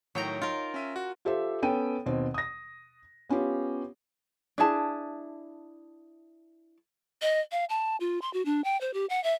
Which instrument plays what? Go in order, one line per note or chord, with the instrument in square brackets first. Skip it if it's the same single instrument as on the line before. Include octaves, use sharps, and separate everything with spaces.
[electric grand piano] A2 D#3 [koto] F#3 G5 A#5
[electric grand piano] D#4 [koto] F4 A#4
[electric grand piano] C#4 E5 D#7
F#4
[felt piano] F4 G4 A4 C5 E5
B3 C#4 A4 G5 D#7
D#2 B2 C4
D#6 A#6
B3 C#4 F4 G4
[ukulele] D4 E4 G#4 A5
[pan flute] D#5
F5
A5
F4
C6
F#4
D4
G5
C5
G4
F#5
E5